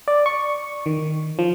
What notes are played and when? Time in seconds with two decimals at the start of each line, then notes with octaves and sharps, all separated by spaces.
0.08 D5
0.26 C#6
0.86 D#3
1.39 F3